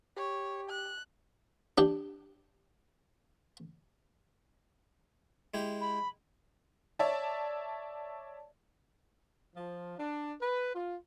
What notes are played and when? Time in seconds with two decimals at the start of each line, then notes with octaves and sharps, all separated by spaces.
0.17 G4 C#5
0.70 F#6
1.78 D4 G4
5.54 G#3 E4 G4
5.81 B5
6.99 C#5 D5 E5 A5
9.56 F3
9.98 D4
10.40 B4
10.75 F4